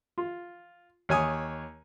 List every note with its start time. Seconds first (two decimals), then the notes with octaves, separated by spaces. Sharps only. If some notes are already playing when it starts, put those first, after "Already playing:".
0.18 F4
1.09 D#2 C#5 G#5 D#6